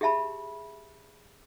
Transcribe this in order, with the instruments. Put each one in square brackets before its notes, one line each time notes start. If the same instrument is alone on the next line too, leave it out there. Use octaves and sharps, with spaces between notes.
[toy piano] G4 G#4 E5 A5 B5